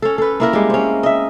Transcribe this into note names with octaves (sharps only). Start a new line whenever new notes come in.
C#4 A4
A4 B4
A#3 E4 A#4
G3 G#3
C4 C#4
D#5 E5